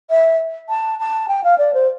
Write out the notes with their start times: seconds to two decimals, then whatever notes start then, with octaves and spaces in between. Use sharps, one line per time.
0.10 E5
0.69 A5
0.99 A5
1.28 G5
1.44 F5
1.58 D5
1.74 C5